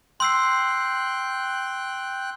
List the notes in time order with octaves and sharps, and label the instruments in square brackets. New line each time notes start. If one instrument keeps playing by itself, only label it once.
[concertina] G5 F#6 [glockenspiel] C6 E6 C7